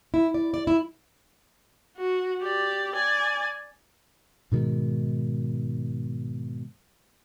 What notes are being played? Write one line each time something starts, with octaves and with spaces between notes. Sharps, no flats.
E4
D5
D5
E4
F#4
G4 D5
D5 G#5
G#2 B2 D#3 G#3